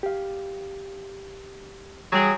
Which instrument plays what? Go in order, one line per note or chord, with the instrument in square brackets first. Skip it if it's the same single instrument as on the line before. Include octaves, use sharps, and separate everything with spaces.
[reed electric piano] G4 F5
[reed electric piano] E3 G3 [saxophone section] F#3 G4 G#4